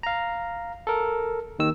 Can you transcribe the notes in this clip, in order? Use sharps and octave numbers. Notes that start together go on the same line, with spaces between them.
F5 A#5
A4 A#4
D#2 D#3 E6